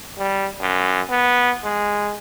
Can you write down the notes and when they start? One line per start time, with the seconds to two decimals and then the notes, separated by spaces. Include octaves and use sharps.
0.19 G3
0.61 F#2
1.10 B3
1.64 G#3